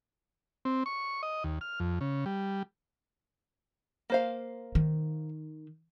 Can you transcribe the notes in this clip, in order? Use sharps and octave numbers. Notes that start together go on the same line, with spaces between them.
C4
C#6
D#5
D#2
F6
F2
C#3
G3
A#3 C5 F5
D#3